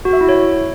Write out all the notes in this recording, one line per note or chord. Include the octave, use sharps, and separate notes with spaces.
F#4
E5
E4
C#5